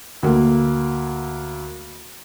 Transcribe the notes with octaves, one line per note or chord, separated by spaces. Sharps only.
D2 A#3